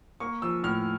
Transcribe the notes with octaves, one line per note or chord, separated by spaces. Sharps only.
A#3 C#6
F3 E6
A2 F6